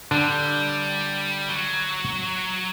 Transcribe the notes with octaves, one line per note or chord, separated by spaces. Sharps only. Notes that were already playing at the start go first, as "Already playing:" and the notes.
D3 G3 D4
F#3